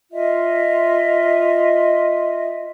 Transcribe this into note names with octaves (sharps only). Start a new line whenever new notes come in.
F4 D#5 E5